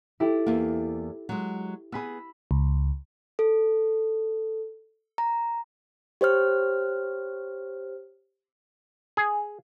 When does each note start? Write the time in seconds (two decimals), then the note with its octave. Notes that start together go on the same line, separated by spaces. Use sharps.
0.20 E4 G4 A4
0.46 E2 A#3
1.29 F#3 G#3
1.92 B3 G#4 B5 E6
2.51 C#2
3.39 A4
5.18 A#5
6.21 G4 C5 C#5 F6
9.17 G#4